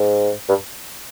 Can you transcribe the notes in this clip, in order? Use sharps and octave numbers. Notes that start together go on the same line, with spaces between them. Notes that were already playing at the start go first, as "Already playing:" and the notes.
Already playing: G#2
G2